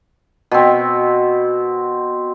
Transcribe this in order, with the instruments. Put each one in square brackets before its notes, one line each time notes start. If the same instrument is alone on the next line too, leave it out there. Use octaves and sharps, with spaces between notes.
[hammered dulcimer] B2 C4